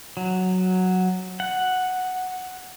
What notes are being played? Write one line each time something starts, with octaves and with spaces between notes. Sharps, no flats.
F#3
F#5